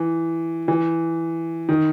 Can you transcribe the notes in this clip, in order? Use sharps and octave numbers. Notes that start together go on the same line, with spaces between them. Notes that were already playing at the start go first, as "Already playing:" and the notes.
Already playing: E3
E3
D#3